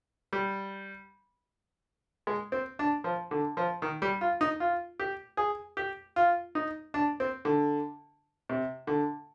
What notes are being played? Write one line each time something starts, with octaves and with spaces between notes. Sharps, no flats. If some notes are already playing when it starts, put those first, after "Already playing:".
G3
G#3
C4
D4
F3
D3
F3
D#3
G3
F4
D#4
F4
G4
G#4
G4
F4
D#4
D4
C4
D3
C3
D3